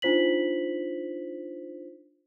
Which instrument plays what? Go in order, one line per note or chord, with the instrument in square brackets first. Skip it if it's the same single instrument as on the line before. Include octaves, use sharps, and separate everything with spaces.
[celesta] D4 D#4 F4 C5 B6 F#7